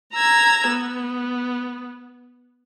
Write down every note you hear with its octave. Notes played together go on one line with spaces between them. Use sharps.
A#5 E6 G#6
B3